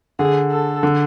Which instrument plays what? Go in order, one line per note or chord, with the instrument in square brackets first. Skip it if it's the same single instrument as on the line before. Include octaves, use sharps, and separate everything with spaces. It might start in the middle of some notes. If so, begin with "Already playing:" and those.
[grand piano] D3 [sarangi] G#4
[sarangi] A4
[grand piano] D3